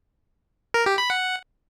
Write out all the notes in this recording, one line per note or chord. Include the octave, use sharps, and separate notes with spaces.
A#4
G4
B5
F#5